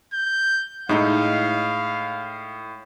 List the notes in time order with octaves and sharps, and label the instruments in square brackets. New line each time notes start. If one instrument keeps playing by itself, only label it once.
[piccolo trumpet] G6
[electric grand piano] A2 [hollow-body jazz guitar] G#3 D#4 E4 [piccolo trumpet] F5